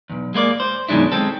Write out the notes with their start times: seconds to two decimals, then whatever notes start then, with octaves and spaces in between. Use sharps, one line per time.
0.10 B1 E2
0.34 G#3 A#3 B4 D5
0.60 C5
0.89 F#2 B2 D#3 G#3 D4 E4
1.12 G#3 C4 A4